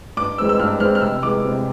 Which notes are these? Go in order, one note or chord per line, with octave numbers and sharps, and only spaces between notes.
G2 D6
E3 G#3 C4 E6
E6
G2 F6
E3 G#3 C4 F6
F6
C3 E6
E3 G#3 D6
C3